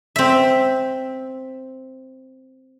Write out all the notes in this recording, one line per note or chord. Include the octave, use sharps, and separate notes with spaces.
C4 E5